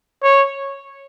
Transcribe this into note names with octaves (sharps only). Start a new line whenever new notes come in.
C#5